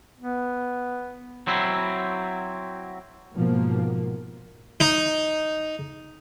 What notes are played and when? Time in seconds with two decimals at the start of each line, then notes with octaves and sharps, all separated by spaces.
0.20 B3
1.47 F#3 C4 E4
3.34 G#2 B2 F3 A#3
4.80 D#4